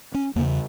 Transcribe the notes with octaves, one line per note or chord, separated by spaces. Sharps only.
C#4
E2 C#3 A#3